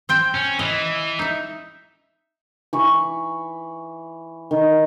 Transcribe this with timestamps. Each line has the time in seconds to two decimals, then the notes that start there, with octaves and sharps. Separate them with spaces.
0.09 C4 C5 G5
0.35 C#4
0.59 E3 D#5
1.19 D#4 E5
2.73 E3 B5 C#6
4.51 D#3